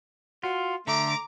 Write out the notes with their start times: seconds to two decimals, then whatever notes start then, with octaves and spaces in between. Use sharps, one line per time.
0.43 F4 F#4
0.87 D3 A3 A#5 D6